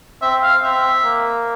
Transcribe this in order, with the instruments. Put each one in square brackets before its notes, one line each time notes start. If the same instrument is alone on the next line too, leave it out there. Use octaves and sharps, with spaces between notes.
[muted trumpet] C4 [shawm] E5
[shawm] F5
[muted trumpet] C4 [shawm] E5
[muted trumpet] A#3